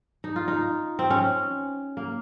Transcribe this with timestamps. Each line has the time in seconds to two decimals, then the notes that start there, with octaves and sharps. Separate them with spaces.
0.24 D#4
0.36 F4
0.48 D#4
0.99 C4
1.10 C#4
1.97 A#3